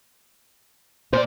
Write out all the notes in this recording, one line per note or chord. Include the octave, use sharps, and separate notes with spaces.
A#2 C5 D5